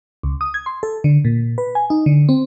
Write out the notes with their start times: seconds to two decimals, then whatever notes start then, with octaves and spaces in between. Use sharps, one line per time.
0.23 C#2
0.41 D#6
0.54 G#6
0.66 C6
0.83 A4
1.04 D3
1.25 A#2
1.58 B4
1.75 G#5
1.90 D#4
2.06 D3
2.29 C4